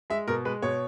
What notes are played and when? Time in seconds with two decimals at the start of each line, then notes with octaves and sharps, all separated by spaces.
0.10 G#3 E5
0.28 B2 A#4
0.45 G#3 B4
0.62 B2 C#5